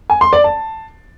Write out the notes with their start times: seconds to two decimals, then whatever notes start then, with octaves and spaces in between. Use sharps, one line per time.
0.10 G#5
0.21 C6
0.33 D5
0.44 A5